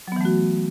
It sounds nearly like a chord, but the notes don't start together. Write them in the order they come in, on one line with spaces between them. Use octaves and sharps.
F#3 B3 E3 A3 F#4